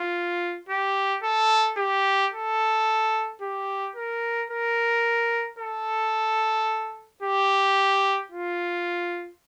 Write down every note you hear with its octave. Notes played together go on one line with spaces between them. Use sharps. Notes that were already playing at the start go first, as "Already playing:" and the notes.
Already playing: F4
G4
A4
G4
A4
G4
A#4
A#4
A4
G4
F4